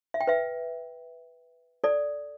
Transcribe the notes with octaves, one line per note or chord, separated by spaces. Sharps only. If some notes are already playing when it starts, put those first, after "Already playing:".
E5
G5
B4 E5
A4 D5